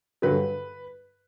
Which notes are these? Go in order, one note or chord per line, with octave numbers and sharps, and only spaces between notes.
G2 D3 F#3 B4